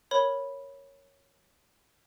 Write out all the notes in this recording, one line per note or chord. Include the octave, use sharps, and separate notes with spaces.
A#4 C#5 B5